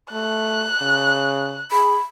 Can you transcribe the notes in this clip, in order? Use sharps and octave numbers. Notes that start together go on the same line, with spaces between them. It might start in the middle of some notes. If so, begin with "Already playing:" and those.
A3 F#6
C#3
G#4 B5